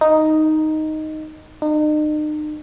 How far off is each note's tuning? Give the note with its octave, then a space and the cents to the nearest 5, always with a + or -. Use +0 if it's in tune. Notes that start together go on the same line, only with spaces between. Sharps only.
D#4 +0
D#4 -40